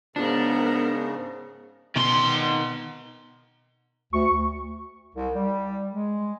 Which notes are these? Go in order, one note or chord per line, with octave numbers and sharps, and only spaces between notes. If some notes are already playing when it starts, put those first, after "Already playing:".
G#2 C#3 B3 D4 A#4
B2 D#3 C6
D2 C#6
C2
G3
G#3